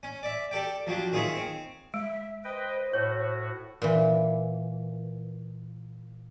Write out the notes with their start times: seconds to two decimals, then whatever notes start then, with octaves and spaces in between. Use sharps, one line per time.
0.03 C#4
0.23 D5 E5
0.51 G4 A4 D5 G5
0.87 F3 F#3 D4 G4
1.12 D#3 C4 F4 G#4 C#5 E5
1.35 C4
1.94 G#3 E5
2.44 B4 C5 D#5 G5
2.93 A2 F#4 C#5
3.82 A#2 E3